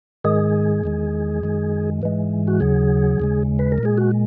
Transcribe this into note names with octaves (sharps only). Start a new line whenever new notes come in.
G#2 D#3 G#3 G#4
E2 D#3 G#3
F#2 D#3 G#3
G#2 E3 G#3
F#4
D#2 C#3 F#3 G#4
D#2 C#3 G#3
B4
A#4
A#2
G#3 G#4
F#4